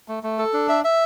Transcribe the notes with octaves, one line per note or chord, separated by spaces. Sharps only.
A3
A3
A4
D4
E5
E5